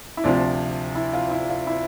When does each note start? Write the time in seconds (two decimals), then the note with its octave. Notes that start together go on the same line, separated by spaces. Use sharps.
0.17 E4
0.24 D2 C3 F3 D4
0.95 E4
1.13 F4
1.31 E4
1.49 F4
1.67 E4